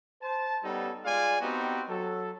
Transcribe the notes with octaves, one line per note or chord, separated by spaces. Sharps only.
C5 A5
G3 B3 C#4 D#4 A4
G#3 F4 D5 F5 G#5
B3 C4 D#4 F#4 G4
F#3 A4